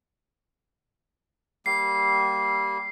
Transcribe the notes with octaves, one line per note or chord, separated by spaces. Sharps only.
G3 A#3 C7